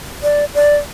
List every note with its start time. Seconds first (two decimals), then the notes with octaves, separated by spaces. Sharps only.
0.23 D5
0.54 D5